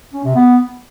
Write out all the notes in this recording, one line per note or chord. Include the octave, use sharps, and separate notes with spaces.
C#4
C3
B3